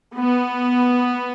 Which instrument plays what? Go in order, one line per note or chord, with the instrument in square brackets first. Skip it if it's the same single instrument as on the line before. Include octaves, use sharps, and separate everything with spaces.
[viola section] B3